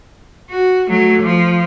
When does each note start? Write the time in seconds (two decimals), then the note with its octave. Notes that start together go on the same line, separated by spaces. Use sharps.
0.50 F#4
0.89 F#3 A3
1.22 F3